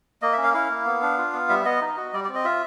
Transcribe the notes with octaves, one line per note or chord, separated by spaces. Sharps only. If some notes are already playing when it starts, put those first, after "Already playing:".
A#3 D#5
E5
C#4
F5
E4 F5
A#3
B3
D4
F4
B3
G3 E5
B3 D#5
D#4
F#4
G3 D5
C4 D5
D#5
F4 E5